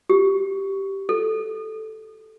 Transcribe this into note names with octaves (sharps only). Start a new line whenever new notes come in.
G4
A4